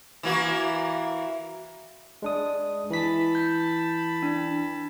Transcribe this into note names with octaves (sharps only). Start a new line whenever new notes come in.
E3 A#3 F#4
G#3 D4 D#6
E3 A5 B5 B6
G6
D4